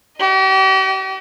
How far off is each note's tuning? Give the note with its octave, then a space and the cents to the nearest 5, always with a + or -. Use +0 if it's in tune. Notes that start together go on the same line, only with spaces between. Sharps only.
G4 -45 D#5 +0